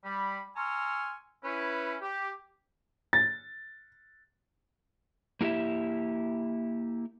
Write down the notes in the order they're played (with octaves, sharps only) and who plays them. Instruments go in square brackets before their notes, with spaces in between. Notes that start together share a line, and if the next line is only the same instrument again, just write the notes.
[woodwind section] G3 B5
G#5 A#5 C6 C#6 E6 F6
C#4 E4 B4
G4
[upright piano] A6
[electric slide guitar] A#3 E4 G4 E5